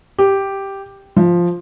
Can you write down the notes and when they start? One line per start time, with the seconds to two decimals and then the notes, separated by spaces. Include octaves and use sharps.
0.18 G4
1.17 F3